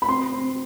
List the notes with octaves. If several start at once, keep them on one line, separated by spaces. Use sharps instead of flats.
B5
C4 C6
C4